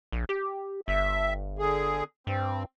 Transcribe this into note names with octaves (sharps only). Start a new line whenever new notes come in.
A#1
G4
G1 E5
D3 G#4
G2 C4